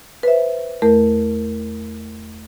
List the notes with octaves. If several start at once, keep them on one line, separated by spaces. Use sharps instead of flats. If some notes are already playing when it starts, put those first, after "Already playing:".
B4 C5 E5
E2 A3 A#4